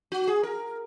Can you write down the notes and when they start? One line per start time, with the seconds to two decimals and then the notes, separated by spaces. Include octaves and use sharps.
0.12 F#4
0.27 G#4
0.43 A#4